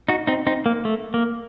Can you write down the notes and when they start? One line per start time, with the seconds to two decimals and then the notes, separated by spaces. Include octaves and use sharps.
0.08 D#4 F#4
0.27 C4 D#4
0.47 C4 D#4
0.66 A#3
0.85 A3
1.14 A#3